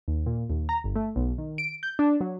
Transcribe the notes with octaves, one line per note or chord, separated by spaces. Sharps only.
D#2
A#2
D#2
A#5
G1
A3
B1
D#3
D7
G6
D4
F#3